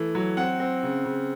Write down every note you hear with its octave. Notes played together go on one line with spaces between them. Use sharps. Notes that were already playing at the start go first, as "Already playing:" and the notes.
Already playing: E3 A3
F#3
C4 F#5
C4
C#3
C#3